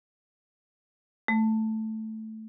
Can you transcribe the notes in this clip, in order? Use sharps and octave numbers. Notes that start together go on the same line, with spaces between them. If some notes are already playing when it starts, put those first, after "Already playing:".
A3